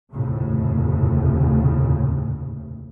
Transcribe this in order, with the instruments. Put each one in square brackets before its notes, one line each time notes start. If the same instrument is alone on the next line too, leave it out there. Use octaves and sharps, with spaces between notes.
[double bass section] F1 D#2 A2 C#3